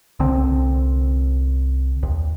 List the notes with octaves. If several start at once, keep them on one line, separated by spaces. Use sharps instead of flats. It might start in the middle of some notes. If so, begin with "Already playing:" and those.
C2 D3 C4
D#2